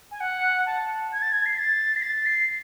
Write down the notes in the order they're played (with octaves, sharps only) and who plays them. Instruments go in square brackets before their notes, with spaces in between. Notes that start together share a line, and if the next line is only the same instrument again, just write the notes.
[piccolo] G#5
F#5
A5
G#6
A6
G#6
C7
A6
C7
A6
C7